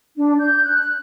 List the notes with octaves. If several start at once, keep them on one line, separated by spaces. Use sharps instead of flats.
D4
G6
F#6